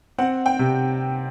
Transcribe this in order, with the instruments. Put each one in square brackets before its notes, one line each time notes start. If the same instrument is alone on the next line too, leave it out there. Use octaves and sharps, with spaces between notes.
[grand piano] C4 [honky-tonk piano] F#5
[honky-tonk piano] G5
[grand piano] C3